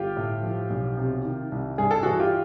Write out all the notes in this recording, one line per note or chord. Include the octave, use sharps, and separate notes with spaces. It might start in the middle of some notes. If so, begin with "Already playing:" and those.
Already playing: G1 F4 G4
A2
F3
B1
C3
D#3
C2
G2 G#4
A4
E3 F#4 G#4
F4 G4